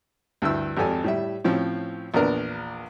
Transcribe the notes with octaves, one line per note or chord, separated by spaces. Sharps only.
D2 G2 E4 E6
G#1 F2 G4 A4 G#5
A2 G3 E5
A2 F3 C4 C#4
A#1 E2 B3 D4 A#4